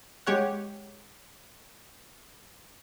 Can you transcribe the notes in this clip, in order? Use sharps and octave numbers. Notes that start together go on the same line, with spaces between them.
G#3 G4 C#5 F#5